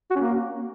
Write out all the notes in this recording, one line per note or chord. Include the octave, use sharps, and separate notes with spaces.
F#4
C#4
A#3